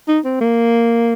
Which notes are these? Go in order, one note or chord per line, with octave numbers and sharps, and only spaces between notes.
D#4
C4
A#3